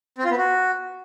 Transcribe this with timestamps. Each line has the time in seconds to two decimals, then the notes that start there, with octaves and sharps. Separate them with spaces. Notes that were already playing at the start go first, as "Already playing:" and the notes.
0.18 C4
0.25 F4
0.31 B3
0.38 F#4